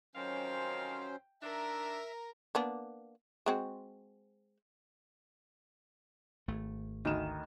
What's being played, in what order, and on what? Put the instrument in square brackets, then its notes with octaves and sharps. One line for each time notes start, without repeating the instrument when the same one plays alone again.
[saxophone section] F2 D#3 F5 [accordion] F#3 C#4 C5 [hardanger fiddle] G5
[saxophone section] D#3 D4 [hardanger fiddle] A#4 A#5 [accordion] E5
[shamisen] A#3 B3 D4
G#3 C4 F#4
[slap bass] G#1 A3
[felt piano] D2 D#4 E7 [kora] D#3